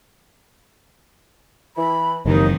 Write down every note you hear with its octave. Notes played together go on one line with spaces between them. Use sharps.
E3 B5
F#1 D#2 C3 D#3 E3 D#4